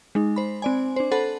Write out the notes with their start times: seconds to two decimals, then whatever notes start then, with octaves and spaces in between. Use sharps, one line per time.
0.15 G#3 D#4
0.36 C5 B5
0.62 C4 D5 G#5
0.96 D4 C5
1.11 A4 C5 F#5 A5 B5